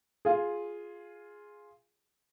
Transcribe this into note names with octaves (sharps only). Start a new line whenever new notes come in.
F4 G#4